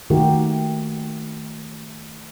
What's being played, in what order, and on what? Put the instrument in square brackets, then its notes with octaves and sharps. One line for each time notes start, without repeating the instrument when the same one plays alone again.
[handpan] D#3 A3 F#4 G4 A#4